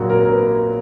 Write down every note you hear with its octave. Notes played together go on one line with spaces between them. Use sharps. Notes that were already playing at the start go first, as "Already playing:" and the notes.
Already playing: A#1 A#2 F#3 A#3 F#4
A#4
A#4
B4